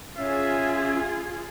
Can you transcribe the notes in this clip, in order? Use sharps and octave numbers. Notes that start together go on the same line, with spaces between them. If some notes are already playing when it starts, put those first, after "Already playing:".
C#4 F4 G#4 E5